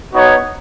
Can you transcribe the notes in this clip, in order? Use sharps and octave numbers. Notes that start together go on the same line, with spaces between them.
B3 D#4 F#4 C#5